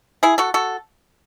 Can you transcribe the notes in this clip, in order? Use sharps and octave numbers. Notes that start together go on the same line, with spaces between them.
E4 G#4
F#4 A4
F#4 A4